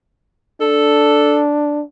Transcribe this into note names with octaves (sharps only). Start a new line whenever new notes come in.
D4 A4